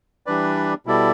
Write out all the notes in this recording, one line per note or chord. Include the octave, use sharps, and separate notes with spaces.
E3 G3 D4 B4 D5
B2 G3 E4 A4 D5